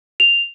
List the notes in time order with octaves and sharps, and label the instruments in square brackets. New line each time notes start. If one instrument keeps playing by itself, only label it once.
[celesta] F7